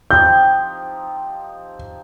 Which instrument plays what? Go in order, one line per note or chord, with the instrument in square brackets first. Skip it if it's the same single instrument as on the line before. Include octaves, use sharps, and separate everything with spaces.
[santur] F3 C4 D#4 G4 [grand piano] G6